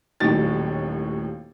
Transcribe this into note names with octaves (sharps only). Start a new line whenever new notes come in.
D#1 D#2 A2 F#3 A6